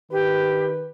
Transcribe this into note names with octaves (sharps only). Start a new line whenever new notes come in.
D#3 G4 B4